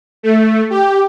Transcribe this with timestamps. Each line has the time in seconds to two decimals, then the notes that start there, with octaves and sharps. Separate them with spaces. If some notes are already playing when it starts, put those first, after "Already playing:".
0.23 A3
0.70 G4